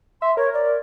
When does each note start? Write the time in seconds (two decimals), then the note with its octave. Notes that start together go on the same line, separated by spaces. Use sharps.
0.22 E5 C6
0.37 A#4 C#5
0.54 D5